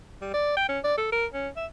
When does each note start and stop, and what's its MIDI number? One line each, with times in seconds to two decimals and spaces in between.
0.21 0.32 55
0.34 0.53 74
0.57 0.65 79
0.69 0.79 61
0.84 0.95 74
0.97 1.08 69
1.12 1.26 70
1.33 1.49 61
1.56 1.66 76